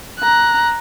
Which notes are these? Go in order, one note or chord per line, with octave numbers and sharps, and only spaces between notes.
A#5 F#6